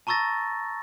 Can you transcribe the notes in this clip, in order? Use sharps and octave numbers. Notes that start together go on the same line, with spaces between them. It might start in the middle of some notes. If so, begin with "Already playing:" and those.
A5 A#5 C#6 E6 A6 A#6